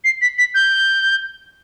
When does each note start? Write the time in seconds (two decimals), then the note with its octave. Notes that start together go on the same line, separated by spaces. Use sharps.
0.05 C7
0.22 B6
0.38 B6
0.55 G6